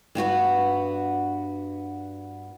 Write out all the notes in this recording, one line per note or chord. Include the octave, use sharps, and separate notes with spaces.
G2 B3 F#4 B4